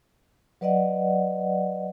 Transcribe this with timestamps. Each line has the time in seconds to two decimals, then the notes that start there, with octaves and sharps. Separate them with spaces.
0.61 F#3 B4 D5 D#5 F#5